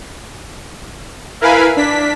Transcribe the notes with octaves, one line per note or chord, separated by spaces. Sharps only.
E4 A#4 B4 F5 G#5 B5
D4 B6